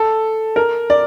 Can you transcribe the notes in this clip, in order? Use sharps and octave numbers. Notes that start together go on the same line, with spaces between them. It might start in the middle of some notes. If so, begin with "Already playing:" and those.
Already playing: A4
A#4
D5